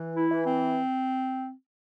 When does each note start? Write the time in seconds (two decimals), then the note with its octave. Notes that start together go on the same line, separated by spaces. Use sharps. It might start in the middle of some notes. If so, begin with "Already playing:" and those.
Already playing: E3
0.15 E4
0.31 E3
0.46 C4